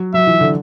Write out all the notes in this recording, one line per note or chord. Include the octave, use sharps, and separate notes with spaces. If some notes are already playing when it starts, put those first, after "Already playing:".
Already playing: F#3
F#3 E5
E3
D3